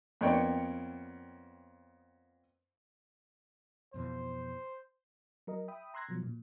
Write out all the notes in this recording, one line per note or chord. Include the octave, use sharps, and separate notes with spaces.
F2 A#3 B3 C#5 D5 G5
F2 B2 E3 C5
F#3 A#4 D#5
E5 G5 B5 D#6
A#5 C6 E6 F#6 G#6 A#6
B2 F3 F#3
A#2